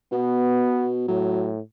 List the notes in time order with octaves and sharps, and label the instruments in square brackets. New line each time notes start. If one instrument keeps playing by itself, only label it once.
[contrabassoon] B2 [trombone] B3
[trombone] A2 [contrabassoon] F#3